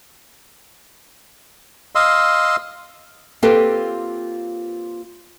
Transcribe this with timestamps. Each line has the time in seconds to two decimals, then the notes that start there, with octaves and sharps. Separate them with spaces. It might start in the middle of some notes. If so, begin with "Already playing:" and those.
1.95 D#5 F5 C6 E6
3.42 A#3 C4 F4 G4 A4 B4